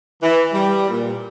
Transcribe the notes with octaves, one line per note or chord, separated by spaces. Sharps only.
E3
G3
A#2